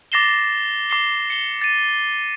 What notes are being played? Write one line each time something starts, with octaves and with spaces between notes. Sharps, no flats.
D6 A6 A#6 C7 E7 G7
D6 C7 G7
C#7 G7
A6 D#7